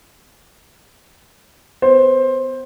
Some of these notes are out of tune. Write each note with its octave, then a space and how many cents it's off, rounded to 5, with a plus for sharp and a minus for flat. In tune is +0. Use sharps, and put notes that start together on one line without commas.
B3 +35 C5 +15